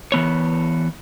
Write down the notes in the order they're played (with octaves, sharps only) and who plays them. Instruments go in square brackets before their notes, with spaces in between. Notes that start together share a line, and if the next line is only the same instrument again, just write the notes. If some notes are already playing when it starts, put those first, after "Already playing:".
[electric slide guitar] E3 B3 C#5